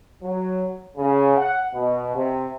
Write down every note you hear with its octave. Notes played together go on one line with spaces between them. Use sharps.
F#3
C#3
F#5
B2
C3